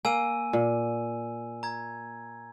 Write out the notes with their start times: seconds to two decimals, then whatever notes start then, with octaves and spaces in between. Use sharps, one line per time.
0.05 A#3 G#5 E6 D#7
0.53 A#2
1.63 A#5 G#6